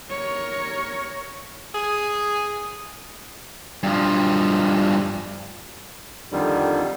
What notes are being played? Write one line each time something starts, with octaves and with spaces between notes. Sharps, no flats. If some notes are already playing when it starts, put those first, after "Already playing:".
A#4 C#5
G#4
G2 F3
F2 D3 D#3 G3